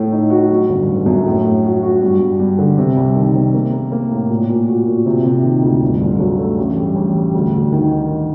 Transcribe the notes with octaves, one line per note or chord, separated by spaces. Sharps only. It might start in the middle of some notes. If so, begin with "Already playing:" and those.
Already playing: A2 A3
D#4
F#4
F#3
G1
G1
F#2
A2
A2
F#4
F#4
G2
G2
G2
D3
C3
C2
D#3
C3
A#3
A#3
A#3
A2
A#2
A#2
F#4
A#2
C3
C3
D#3
D2
G1
G1
F#3
A3
A1
G3
A1
G3
D2
D2
D#3
D#3